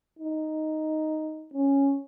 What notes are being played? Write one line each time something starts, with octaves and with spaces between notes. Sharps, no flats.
D#4
C#4